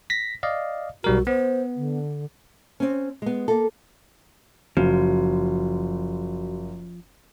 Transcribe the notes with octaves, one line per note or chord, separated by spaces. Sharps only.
A#6 B6
D5 D#5 F5
B1 G3 F#4 A#4
B3 C5
D3
C4 C#4
G#3 B3
A#3 A4
F#1 F3 F#4